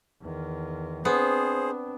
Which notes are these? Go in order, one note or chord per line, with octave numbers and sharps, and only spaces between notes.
E2 D#3
B3 C4 D4 G#4 C5